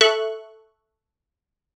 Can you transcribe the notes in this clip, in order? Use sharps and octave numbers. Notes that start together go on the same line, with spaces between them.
A4 E5 C#6 F#6